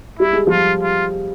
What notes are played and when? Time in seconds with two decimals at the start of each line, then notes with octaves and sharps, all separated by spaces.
0.19 G3 E4
0.33 G#3
0.47 F3 G3 F4
0.83 F4